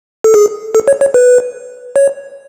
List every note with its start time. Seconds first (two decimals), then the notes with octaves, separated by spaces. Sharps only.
0.24 A4
0.34 G#4
0.75 A4
0.88 C#5
1.01 C#5
1.14 B4
1.96 C#5